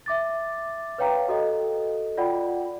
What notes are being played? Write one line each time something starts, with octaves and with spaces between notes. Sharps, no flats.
E5 D6 A6
B4 C#5 F5 G5 A#5
F#4 A4 D#5
F4 D5 F#5 G5 B5